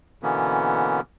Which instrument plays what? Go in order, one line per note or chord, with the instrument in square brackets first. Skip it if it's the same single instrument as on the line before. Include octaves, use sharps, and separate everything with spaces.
[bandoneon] B2 D3 E3 A#3 B3 C#4